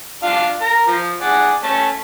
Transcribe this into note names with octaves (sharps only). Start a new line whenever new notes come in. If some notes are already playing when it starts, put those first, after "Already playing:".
D4 F4 F5
A#4 A#5
F3
G#4 D5 F#5
A3 C#4 A5